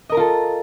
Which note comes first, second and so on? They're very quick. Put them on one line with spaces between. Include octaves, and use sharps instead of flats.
D#5 A#4 A#5 F4 A4